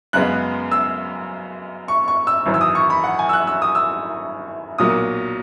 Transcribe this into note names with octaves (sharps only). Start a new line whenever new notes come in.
F#2 C#3 G#3 B3 F#6
E6
C#6
C#6
E6
G#1 F#2 E3
E6
D#6
C#6
B5
F#5
G#5
E6
F#6
E6
D#6
E6
B1 A#2 F#3 A#3 D#6